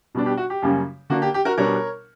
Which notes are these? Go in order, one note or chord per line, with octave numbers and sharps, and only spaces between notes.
B2 G3 B3 D4
G4
F#4
G4
F#2 C#3 G3 A#3 C#4
D3 A#3 D4 F#4
G4
G4
F#4 A#4
B2 G3 B3 D4 A#4 C#5